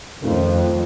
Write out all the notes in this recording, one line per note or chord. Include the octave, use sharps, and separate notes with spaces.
F2 D#3 A3 C#4 F4